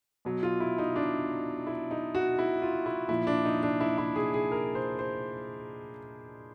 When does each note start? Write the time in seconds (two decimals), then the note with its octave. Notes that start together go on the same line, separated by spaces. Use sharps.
0.25 B2 F#3
0.43 F4
0.60 E4
0.78 D#4
0.96 D4
1.67 E4
1.91 D#4
2.15 F#4
2.39 E4
2.62 F4
2.86 E4
3.09 A#2 F3 E4
3.27 D4
3.45 D#4
3.63 D4
3.81 E4
3.98 E4
4.16 G#4
4.34 G#4
4.52 A#4
4.75 C5
4.99 C5